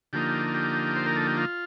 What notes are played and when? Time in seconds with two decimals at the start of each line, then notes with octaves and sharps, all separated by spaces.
0.13 D3 F3 A#3 D#4 G4
0.54 G4
0.96 C5
1.06 A#4
1.16 A4
1.27 G4
1.37 F4